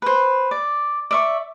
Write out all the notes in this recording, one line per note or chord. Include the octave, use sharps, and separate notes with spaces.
B4 C5
D5
D5 E5 C#6